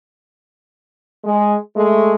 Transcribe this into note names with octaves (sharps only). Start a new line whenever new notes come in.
G#3
G#3 A3